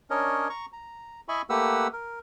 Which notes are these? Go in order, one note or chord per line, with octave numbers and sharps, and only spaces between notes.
C#4 D4 A#4 C#5 D#5
A#5 C#6
A#5
E4 D#5 E5 G#5 B5 C#6
A3 A#3 G4 B4 F#5 E6
A#4